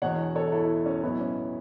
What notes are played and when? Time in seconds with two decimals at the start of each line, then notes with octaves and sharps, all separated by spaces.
0.02 E1 E2 B2 C#5 F#5
0.36 A4 C#5
0.52 E4 A4
0.86 C#4
1.03 B1 A2 F#3 B3 E4
1.21 C#4